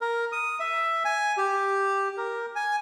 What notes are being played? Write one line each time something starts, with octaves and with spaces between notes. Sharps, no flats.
A#4
D#6
E5
G#5
G4
A#4
G#5